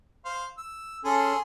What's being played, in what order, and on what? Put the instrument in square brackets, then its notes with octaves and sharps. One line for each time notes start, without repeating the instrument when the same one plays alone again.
[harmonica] C5 F5
E6
[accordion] C#4 A4 [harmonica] G#4 G#5 C6